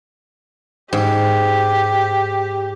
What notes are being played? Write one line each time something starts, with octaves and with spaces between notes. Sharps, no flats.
G#2 G4